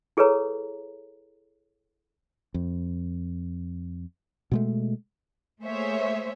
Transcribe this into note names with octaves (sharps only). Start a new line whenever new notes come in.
E4 G#4 A4 B4 C#5 A#5
F2
B2 G#3 A3
A3 A#3 G#4 C5 C#5 E5